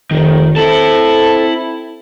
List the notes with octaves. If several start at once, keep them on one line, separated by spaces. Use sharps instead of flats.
F1 D#3
C4 E4 A4 A5